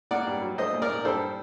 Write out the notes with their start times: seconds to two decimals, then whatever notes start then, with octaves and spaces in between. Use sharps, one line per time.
0.11 A#3 D5 F#5
0.27 G2
0.42 F#3
0.58 A3 C5 D#5
0.74 A#2
0.82 A#4 D5
0.89 A#2
1.05 G2 A4 C5